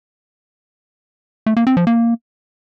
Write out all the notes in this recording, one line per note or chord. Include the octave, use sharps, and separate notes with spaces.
A3
A#3
C4
F3
A#3